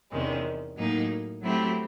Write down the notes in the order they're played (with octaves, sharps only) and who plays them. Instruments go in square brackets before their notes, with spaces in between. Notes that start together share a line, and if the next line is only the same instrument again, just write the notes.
[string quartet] E2 C3 D#3 G#3 C#4
A2 F#3 A#3 D#4 G#4
F#3 A3 C4 E4 G4